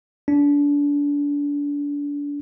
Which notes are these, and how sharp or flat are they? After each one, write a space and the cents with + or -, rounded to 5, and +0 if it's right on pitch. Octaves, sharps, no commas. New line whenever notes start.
D4 -30